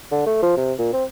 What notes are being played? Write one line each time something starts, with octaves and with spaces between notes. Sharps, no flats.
D3
A3
F3
C3
A#2
C4